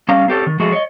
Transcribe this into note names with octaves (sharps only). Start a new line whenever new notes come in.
G3 C#4 F5 A#5
C4 G4 A4 C#5
D#3
F3 G#3 A3 F#4 G#4
C#5 D#5